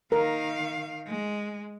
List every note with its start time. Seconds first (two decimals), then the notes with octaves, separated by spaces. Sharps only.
0.12 D#3 A#4 F5
1.07 G#3